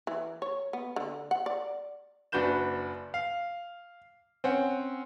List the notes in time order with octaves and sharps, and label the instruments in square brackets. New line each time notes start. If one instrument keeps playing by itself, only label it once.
[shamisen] E3
C#5
B3
D3
F#5
D5
[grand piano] F#1 D4 F#4 B4 G6 E7
F5
C4 C#4 F#5